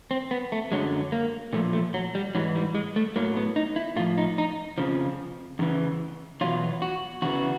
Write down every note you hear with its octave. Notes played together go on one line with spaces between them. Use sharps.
C4
B3
A3
F#2 D3 F#3 G#3
A#3
A#2 F3 A3
A3
F#3
G3
G#2 E3 F#3
G3
G#3
A3
A2 F#3 A#3
B3
D#4
E4
A2 F3 F4
D#4
D#4
F2 C#3 F3
E2 C#3 E3
E2 B2 F#3 F4
F#4
E2 C#3 E3 F#4